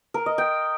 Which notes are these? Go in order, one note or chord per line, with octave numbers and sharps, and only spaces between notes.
A#4
D#5
G5